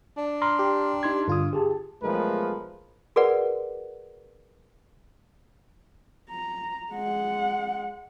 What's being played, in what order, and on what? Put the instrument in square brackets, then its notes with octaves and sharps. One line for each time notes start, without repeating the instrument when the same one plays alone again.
[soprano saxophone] D4
[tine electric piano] A#5 C6 F6
[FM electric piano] G4
[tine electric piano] D#4 C6 G#6
[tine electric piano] G2 D#6 [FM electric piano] D3 F4
[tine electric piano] G4 G#4 A5
[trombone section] B1 F3 G#3 A3 A#4 B4
[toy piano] F#4 G#4 A#4 B4 D5 F#5
[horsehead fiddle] A#5
G#3 F#5